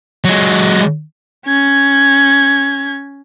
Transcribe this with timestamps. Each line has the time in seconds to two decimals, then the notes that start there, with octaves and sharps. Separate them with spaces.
0.25 F#3 G#3
1.46 C#4 G#6